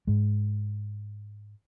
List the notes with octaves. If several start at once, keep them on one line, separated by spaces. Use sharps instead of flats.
G#2 G#3